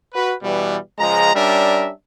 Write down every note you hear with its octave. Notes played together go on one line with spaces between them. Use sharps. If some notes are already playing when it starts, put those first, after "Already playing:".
F#4 B4
B2 E3 G3
C#2 F3 G#3 A#5
G3 C#4 D4 A#4 E5